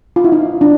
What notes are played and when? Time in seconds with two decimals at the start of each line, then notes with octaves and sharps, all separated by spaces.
0.16 F4
0.24 E4
0.32 D#4
0.61 D4